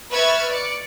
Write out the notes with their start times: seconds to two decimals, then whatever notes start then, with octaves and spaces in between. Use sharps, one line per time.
0.11 B4 E5 C#6 F6 G#6 A6
0.50 D5 C#7